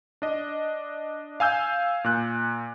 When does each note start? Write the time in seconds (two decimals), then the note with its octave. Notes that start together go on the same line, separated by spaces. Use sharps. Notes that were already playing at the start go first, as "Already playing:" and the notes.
0.22 D4 D#5
1.40 F5 G#5 E6 G6
2.04 A#2 F#6